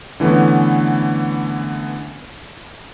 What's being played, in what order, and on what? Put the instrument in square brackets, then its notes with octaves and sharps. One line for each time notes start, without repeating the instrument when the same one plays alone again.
[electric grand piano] D3 E3 A3 B3 C#4